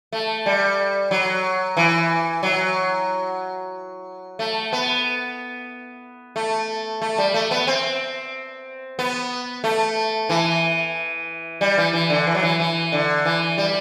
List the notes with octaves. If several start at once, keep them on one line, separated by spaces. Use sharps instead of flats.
A3
G3
F#3
E3
F#3
A3
B3
A3
A3
G3
A3
B3
C4
B3
A3
E3
G3
E3
E3
D3
E3
F#3
E3
E3
D3
E3
G3